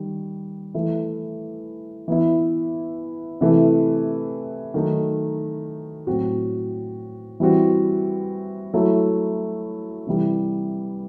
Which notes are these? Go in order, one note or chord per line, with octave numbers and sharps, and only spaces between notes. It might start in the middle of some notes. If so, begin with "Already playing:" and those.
Already playing: D#3 G3
E3 A3 E4
E3 B3 E4
C3 E3 A3
D#3 F#3 A3 D#4
A2 F#3 C4 F#4
E3 G3 C4 F#4
F#3 A3 E4
C3 E3 G3